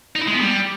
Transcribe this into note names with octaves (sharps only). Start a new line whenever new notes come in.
D#4
E4
G#3
B3
G3